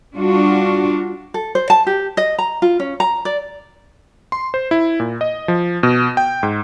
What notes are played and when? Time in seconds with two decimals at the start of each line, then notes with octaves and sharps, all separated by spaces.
0.16 G3 D4 F4 F#4
1.34 A4
1.55 C5
1.70 A5
1.87 G4
2.17 D#5
2.38 A#5
2.62 F4
2.80 C#4
3.00 A#5
3.25 D5
4.32 C6
4.54 C5
4.71 E4
5.00 A#2
5.21 D#5
5.48 F3
5.83 B2
6.17 G5
6.43 G#2